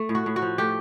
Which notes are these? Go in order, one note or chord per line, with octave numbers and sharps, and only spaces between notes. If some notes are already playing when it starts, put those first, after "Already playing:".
Already playing: A3
A2
F#4
A2
F#4
F3
A3 G4